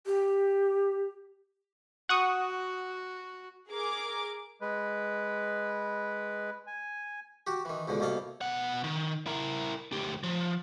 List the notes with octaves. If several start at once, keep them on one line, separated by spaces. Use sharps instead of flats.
G4
F#4 F#5 C#6 D#6
G#4 A#4 D6
G#3 B4
G#5
F#4 G4
D#3 E3
C#2 G#2 B2 D3
C2 B2 A#3 A4 F5
B2 F#5
D#3
E4 A#4
D2 G4
F3